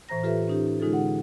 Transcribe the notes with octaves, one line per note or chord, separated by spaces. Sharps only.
A2 E3 C5 A#5 A#6
F4 G4 A4 B4 E5
C#4 D#4 G4
D3 G#3 D#4 F4 G#4 A4
F#5